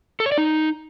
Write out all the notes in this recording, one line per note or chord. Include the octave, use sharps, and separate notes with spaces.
A4
C#5
D5
D#4